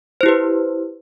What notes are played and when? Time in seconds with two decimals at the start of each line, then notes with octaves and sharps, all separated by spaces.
0.21 C5
0.23 E4
0.26 G4
0.28 B4